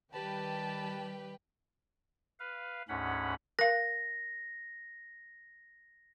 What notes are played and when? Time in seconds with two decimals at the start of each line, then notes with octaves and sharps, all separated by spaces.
0.13 D#3 G3 G4 B4 G5 A5
2.40 B4 F5
2.89 D2 G#2 C#4 F#5 B5
3.59 A#4 F5 A#6